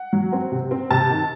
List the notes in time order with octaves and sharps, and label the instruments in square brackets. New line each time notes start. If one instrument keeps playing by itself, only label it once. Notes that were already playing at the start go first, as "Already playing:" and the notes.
Already playing: [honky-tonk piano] F#5
F#3
C4
C3
C4
C3 A5
D#3